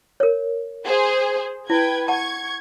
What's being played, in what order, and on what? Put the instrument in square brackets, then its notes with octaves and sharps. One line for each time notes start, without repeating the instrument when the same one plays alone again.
[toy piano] A#4 C#5
[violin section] G#4 C5
[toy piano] E4 [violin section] B4 G5 G#6
[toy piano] F#5 A5 [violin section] C#6 G#6